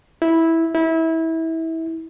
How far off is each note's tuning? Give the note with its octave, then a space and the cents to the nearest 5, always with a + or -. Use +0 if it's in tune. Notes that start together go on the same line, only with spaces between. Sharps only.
E4 -10
E4 -25